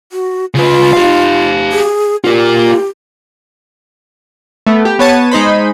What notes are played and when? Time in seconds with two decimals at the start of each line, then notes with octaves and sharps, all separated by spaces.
0.12 F#4
0.54 C#3 F4 B4
0.93 G4 F5
1.72 G#4
2.24 F4 G4 A#4
4.67 A3 B3
4.85 G4
4.99 B3 C#5 A5 D#7
5.31 G#3 D#4 C5 B5